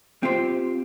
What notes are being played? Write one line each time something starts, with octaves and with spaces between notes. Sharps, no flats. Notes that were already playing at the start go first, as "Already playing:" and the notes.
C4 F4 G4 C5